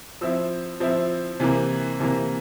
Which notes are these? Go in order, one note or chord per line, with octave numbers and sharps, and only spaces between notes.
F3 C4 E4 E6
F3 C4 E4
C3 E3 A#3
C3 E3 A#3